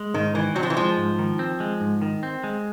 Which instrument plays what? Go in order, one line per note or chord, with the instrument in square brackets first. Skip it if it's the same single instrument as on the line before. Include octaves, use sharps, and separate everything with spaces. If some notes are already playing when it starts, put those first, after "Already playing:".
Already playing: [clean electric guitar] G#3
[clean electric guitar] G#2 [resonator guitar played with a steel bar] D#3
[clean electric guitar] D#3 [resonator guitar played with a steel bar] E3
[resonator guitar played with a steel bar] F#3 [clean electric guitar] C4
[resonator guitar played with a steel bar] F3
E3
[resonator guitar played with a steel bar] F3 [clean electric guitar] G#3
[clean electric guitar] G#2
D#3
C4
G#3
G#2
D#3
C4
G#3